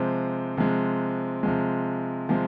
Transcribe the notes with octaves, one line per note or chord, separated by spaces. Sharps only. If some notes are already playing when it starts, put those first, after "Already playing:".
Already playing: C3 F3 G#3 C5
C3 F3 G#3
C3 F3 G#3
C3 F3 G#3